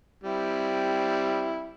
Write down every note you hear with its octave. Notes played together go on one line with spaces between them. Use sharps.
G3 C4 E4